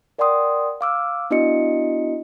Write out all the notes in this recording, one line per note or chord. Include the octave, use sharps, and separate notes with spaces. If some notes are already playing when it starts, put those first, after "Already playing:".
A#4 D5 F#5 G5 C6 D#6
F5 D6 E6 F6
B3 D4 E4 F#4 D#5 C#7